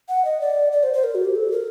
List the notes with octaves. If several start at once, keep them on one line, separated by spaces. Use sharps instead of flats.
F#5
D#5
D5
D5
C5
C5
A#4
F#4
G4
A4
A#4